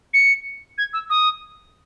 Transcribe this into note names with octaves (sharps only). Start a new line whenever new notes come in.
C#7
G#6
E6
D#6